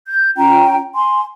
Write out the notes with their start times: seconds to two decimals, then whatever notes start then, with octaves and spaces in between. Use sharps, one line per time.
0.07 G6
0.37 C#4 F4 G5 A#5
0.95 G#5 C6